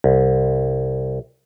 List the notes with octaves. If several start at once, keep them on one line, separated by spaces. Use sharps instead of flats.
C2